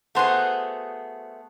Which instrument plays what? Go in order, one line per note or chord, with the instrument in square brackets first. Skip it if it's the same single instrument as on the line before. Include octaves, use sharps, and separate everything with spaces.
[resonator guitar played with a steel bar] A3 B3 G#4 [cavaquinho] F#4 C5